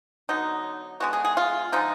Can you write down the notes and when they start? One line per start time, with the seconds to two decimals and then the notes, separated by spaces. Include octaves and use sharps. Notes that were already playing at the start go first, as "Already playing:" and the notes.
0.29 D3 F#3 B3 D#4
1.00 D3 G#3 B3 F#4
1.13 G#4
1.25 G#4
1.37 F4
1.72 D3 F3 G#3 D#4